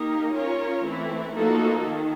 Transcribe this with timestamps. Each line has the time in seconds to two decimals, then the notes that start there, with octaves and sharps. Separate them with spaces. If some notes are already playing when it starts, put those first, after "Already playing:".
Already playing: A#3 D#4 G4 A#4
0.34 C#4 F4 A#4 C#5
0.85 E3 A3 C4 E4
1.35 F3 A#3 D#4 F#4 A4
1.85 D#3